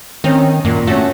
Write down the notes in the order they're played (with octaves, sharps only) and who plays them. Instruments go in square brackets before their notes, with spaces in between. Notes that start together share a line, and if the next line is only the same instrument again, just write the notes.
[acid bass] D#3 [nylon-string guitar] C4 C#4
[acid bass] F#2 [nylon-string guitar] A#2
[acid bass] A3 [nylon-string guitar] C#4 F#4